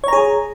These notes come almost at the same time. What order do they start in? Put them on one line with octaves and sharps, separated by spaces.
C#5 A#5 G#4